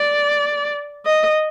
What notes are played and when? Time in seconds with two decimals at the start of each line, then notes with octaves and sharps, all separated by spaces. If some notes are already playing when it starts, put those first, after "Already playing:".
Already playing: D5
1.05 D#5